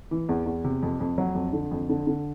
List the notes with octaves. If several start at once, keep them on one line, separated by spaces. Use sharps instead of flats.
E3
E2
E2
C3
F2
F2
F#3
F2
D3
F2
D3
D3